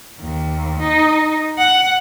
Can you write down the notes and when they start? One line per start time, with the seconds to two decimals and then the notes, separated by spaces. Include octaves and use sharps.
0.20 D#2
0.81 D#4
1.58 F#5